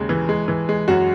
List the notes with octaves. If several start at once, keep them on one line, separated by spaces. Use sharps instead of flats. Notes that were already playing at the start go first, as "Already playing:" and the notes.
Already playing: D#2 C#3 G#3
E3
G#3
E3
G#3
F#2 F#4